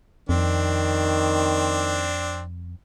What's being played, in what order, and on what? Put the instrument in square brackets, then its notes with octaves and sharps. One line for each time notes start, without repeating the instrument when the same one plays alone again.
[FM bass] F2 [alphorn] D#3 [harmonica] C4 D4